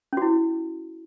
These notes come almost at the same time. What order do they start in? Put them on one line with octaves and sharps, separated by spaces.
C#4 F#4 E4